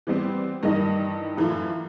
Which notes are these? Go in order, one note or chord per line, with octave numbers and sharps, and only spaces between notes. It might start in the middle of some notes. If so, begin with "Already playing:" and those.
E3 G3 B3 C4
G2 D#3 E3 A#4 D#5
F#2 E3 A3 E4 F4